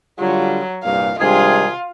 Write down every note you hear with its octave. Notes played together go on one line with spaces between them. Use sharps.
D3 F#3 G3 F4
C2 G2 A#2 F5
C3 D#3 G3 G#3 D4 F4 G#4